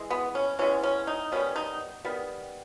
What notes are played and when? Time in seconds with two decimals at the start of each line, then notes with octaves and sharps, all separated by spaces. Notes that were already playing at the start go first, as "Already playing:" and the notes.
Already playing: E3 G#3
0.11 B3
0.35 C#4
0.59 E3 G#3 B3 C#4
0.83 C#4
1.07 D#4
1.32 D#3 G3 B3 C#4
1.56 D#4
2.05 D#3 G3 B3